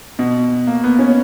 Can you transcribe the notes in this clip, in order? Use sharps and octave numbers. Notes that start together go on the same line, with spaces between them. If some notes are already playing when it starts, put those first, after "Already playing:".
B2
A#3
B3
C#4